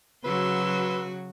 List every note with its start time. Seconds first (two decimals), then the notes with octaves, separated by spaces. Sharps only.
0.25 C#3 F#3 F#4 B4 C6 E6